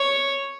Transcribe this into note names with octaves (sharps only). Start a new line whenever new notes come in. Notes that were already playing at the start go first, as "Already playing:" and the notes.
Already playing: C#5